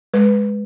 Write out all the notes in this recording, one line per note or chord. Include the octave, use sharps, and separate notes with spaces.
G#3 B4